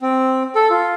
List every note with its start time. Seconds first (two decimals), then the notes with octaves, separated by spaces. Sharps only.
0.01 C4
0.55 A4
0.70 F4